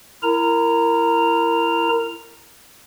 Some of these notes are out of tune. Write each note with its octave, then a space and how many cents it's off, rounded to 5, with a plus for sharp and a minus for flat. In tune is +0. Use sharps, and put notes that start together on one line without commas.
E4 +25 A#4 -15 A#5 -10